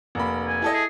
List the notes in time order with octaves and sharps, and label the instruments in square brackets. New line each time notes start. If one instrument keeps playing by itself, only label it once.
[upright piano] F1 A#3 B5
[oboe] G#5
[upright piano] E4 A4 D#5
[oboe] G#4